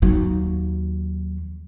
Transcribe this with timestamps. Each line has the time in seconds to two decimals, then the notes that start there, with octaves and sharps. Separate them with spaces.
0.02 D#2 F#3